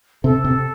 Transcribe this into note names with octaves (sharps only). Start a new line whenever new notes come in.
C3 A4
C3